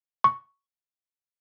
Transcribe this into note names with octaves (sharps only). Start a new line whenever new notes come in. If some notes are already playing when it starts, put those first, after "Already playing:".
C#6